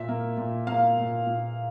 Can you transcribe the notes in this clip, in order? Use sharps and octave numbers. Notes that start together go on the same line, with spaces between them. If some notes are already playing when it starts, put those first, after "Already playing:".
Already playing: A#2 E5
A#3
A#2
A#3 F5
A#2
A#2